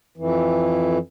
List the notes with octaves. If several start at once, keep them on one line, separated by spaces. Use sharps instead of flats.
F2 E3